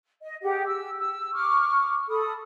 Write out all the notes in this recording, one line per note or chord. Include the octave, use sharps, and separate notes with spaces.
D#5
G4 G#4 F#5
E6
E6
C#6 D6 F6
A4 B5 D#6